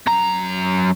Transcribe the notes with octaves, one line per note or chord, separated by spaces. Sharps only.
F#2 A#5